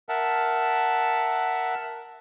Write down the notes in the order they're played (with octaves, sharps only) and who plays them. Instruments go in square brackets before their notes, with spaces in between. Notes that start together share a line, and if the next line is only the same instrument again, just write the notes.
[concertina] A#4 E5 F#5 A5